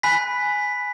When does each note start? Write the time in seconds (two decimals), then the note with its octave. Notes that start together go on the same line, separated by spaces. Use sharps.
0.03 G#5 B5 F#6 B6